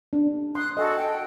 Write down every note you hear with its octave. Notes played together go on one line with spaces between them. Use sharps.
D4
C6 D#6 F#6
F#4 A4 D#5 G#5
G5